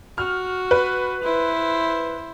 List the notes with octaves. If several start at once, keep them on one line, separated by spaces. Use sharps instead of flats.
F#4 F6
B4
E4 C5